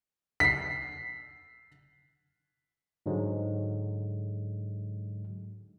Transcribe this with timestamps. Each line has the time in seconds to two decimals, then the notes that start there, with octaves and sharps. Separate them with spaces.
0.40 B6 C7
3.06 G#2 D3 F#3 G#3